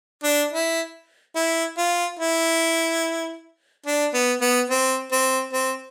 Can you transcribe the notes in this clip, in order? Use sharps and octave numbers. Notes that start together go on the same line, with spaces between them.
D4
E4
E4
F4
E4
D4
B3
B3
C4
C4
C4